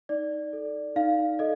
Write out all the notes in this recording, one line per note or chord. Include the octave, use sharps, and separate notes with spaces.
D#4 D5
A4
D#4 F5
A4 D#5